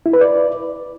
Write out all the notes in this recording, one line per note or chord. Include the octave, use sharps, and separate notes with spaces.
E4
B4
D5